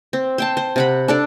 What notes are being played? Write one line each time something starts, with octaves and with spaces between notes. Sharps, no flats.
C4
C5 G5 A5
C5
C3 F#5 B5
D4 A4 D5